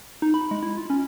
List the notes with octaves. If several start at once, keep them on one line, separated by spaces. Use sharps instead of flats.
D#4
B5
G#3
E4
F4
C#4